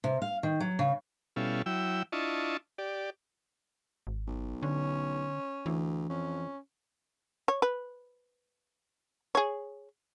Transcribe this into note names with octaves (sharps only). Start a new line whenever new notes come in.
C3
F5
D#3
F#3
C#3
B2 G3 C#4 E4 A4 F5
F#3 E4 G5 E6
D4 E4 F4 D#5 A5 C#6
G4 D5
G#1
B1
D3 C#4
D2 E3
F2 C#4
C#5
B4
G#4 C#5